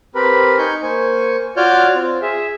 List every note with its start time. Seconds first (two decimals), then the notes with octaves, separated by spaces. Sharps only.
0.15 C4 G4 A#4 B4 B5
0.58 D#4 G#5 C#6 G6
0.83 A#3 C5 G#5 C#6
1.57 F4 F#4 C#5 D5 F6 G6
1.95 C4 F4
2.22 G#4 E5